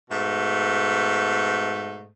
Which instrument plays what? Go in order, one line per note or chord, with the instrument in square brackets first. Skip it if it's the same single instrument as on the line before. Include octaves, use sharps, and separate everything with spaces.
[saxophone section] G#2 B2 A3